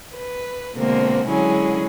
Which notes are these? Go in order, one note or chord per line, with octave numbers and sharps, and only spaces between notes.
B4
B2 D3 G#3 A#3 C4
D3 F#3 G#3 C#4 E4 G#4